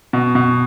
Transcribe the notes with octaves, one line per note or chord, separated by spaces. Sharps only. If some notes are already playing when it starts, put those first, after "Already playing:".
B2
B2